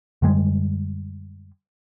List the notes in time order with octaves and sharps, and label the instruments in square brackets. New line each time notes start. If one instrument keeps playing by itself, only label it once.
[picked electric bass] F#2 D3 G3 G#3